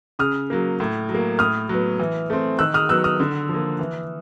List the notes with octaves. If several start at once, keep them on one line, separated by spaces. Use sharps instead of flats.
C#3 D#6 F6
F#3 A#3
A2
F#3
A#3
A2 D#6 F6
F#3 B3
E3
A3 C4
D#3 E6 F#6
D#6 F6
F#3 B3 E6 F#6
D#6 F6
D3
F3 A#3
E3